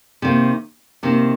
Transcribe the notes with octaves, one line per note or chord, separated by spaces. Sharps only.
C3 D#3 A#3
C3 D#3 A#3